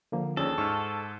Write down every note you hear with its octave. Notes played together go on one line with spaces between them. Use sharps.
D3 F3 A#3
D#2 F3 C#4 D4 G#4 A4
G#2 C#6 E6 F6